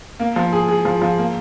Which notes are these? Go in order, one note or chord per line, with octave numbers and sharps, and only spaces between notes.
A#3
F3
G#4
G#4
F3
F3
A#3